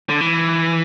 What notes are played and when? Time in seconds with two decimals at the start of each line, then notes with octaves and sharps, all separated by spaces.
0.09 D3
0.21 E3